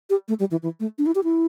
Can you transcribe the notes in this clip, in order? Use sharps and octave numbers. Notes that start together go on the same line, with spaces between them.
G4
A3
G3
E3
E3
A3
D4
E4
G4
E4